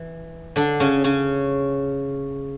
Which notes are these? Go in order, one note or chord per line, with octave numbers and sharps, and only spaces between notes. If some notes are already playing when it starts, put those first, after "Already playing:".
Already playing: E3
D3 D4
C#3 C#4
C#3 C#4